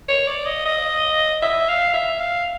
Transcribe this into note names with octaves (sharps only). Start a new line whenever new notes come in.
C#5
D5
D#5
D#5
E5
F5
E5
F5